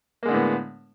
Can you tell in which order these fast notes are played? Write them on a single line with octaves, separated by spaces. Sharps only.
A#3 G#3 D3 A2 B3